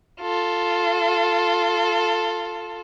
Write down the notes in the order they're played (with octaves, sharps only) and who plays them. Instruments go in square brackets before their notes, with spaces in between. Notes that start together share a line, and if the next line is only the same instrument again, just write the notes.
[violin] F4 A4